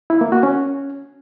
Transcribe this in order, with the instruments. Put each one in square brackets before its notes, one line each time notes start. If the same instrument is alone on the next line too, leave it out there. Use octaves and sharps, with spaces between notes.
[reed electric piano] E4
A#3
F#4
C#4